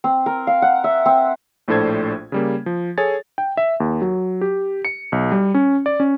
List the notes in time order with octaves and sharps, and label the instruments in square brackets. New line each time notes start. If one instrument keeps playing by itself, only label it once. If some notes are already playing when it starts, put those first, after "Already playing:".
[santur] C4
A#4
F5
F#5
E5
C4
[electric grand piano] A#1 A2 D4 A4 C5 G#6
C#3 G3 A#3
F3
G#4 A4 C#5 G#5 A6
G5
E5
D#2
F#3
G4
C#7
B1
G3
C#4
D5
C#4